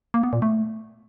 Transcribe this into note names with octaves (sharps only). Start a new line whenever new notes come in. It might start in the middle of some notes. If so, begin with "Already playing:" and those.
A#3
B3
A#2
A3